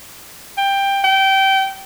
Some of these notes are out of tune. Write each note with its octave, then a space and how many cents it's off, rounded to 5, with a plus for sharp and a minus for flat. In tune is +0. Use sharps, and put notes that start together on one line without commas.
G5 +15
G5 -20